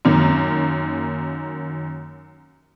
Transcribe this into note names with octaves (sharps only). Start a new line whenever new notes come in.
F#2 D#3 A#3